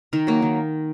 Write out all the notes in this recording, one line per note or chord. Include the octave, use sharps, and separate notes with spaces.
D#3 A#4
F#3 A#3
D#3